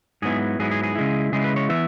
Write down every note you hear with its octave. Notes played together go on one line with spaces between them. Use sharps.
G#2 F#3 B3 E4 G#4
G#2 F#3 B3 E4 G#4
G#4
G#4
C#3 G#3 E4
C#3 G#3 E4 G#4
B4
C#5
E3 B3 E5